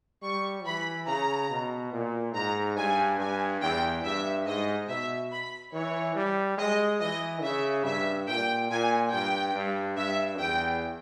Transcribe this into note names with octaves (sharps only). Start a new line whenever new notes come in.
G3 C#6
E3 B5
C#3 A#5
B2
A#2
G#2 A#5
G2 G#5
G2 G#5
E2 G5
G2 E5
G#2 D#5
B2 E5
B5
E3 C#5
G3
G#3 D#5
E3 D#5
C#3 E5
G2 E5
A#2 G5
A#2 G#5
G2 G5
G2
G2 E5
E2 G5